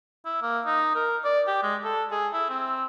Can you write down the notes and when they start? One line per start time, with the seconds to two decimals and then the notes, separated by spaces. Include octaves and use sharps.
0.25 E4
0.42 A#3
0.65 D#4
0.95 A#4
1.24 D5
1.47 G4
1.63 G#3
1.84 A4
2.11 G#4
2.33 E4
2.50 C4